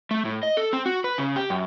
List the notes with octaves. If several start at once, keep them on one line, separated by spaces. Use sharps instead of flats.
A3
A2
D#5
A4
C4
F#4
B4
C#3
G4
F#2